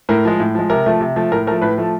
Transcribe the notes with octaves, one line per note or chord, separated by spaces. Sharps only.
A2 A#4
F3 G#3
A2
F3 G#3
C3 A#4
F3 A3
C3
F3 A3
A2 A#4
F3 A3 A#4
A2 B4
F3 A3